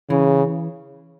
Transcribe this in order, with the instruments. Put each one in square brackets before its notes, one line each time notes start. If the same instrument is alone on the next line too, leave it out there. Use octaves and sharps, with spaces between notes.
[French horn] C#3 [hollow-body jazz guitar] E3